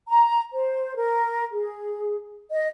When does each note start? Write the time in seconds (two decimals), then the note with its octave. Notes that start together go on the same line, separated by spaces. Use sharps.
0.09 A#5
0.52 C5
0.97 A#4
1.52 G#4
2.51 D#5